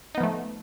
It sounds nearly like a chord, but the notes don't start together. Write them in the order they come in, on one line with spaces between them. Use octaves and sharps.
D#4 B3 F3 A3